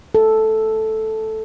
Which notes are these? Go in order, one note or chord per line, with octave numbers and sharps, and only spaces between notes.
A4